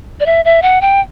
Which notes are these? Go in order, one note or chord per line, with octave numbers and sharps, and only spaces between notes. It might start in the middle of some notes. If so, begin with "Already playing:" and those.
D5
E5
E5
F#5
G5